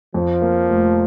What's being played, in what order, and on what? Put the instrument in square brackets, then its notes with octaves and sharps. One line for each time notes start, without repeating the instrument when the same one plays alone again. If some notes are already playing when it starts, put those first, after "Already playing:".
[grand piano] F2 [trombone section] F3
[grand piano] A#3
F1